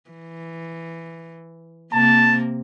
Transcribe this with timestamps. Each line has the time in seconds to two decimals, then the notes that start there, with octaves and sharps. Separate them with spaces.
0.10 E3
1.93 C3 A#3 C4 A5